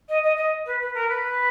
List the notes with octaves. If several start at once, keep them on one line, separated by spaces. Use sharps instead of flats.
D#5
D#5
D#5
B4
B4
A#4
B4